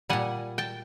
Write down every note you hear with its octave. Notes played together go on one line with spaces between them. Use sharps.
A#2 G3 F#5 G#5
G5 A5